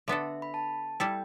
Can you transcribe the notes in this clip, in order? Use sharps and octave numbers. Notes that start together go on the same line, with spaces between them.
D3 B3 D4 A4 E5
B5
A5
G3 E4 A4 G5